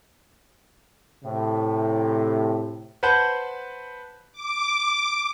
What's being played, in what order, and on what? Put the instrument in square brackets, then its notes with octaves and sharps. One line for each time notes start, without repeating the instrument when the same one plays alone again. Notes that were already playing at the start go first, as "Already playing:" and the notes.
[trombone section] A2 C3
[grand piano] B4 C5 F#5 A5 F#6 G6
[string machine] D6